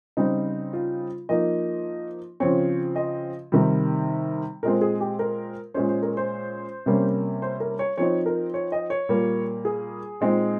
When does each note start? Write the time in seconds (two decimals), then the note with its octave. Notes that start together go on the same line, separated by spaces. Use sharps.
0.17 C#3 G3 C4 D#4
0.73 F4
1.29 F3 A#3 D#4 D#5
2.40 C#3 F3 C4 C#5
2.96 D#5
3.52 C3 D#3 G3
4.63 A#2 G#3 C4 A#4
4.82 G#4
5.00 G4
5.19 A#4
5.74 A#2 G#3 C#4 C5
5.89 C5
6.03 A#4
6.17 C5
6.86 C3 G3 A#3 C#4
7.42 C5
7.60 A#4
7.79 C#5
7.97 F3 C4 D#4 C#5
8.26 A#4
8.54 C#5
8.72 D#5
8.90 C#5
9.09 A#2 G3 A#3
9.65 G#4
10.21 A#2 G#3 C4 D#4